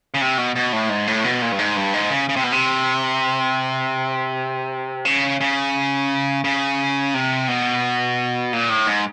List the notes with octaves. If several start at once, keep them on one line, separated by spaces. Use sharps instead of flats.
C#3
C3
B2
B2
A2
G#2
A2
B2
A#2
G2
G#2
G2
G#2
C#3
C#3
C3
B2
C3
C#3
C#3
C#3
C3
B2
A#2
A2
G#2